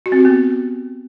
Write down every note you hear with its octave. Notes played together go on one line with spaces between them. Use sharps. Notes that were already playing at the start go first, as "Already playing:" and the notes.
F#4
C4
G4
B3